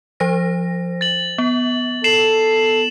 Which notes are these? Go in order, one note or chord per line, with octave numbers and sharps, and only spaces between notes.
F3 C5 A#6
A6 F#7
B3
A4 C7 E7 F#7